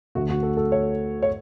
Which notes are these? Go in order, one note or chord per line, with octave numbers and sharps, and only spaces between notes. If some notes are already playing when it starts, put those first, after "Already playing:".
D2 D3 A3 F#4
F#4
A4
A4
C#5
C#5